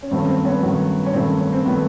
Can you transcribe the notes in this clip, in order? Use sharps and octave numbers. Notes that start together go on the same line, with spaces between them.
C#4
G2 D#3 F#3 A3 C4
C#4
C4
B3 C#4
G2 D#3 F#3 A3
C#4
G2 D#3 F#3 A3 C4
C#4
C4
D#3 F#3 A3 B3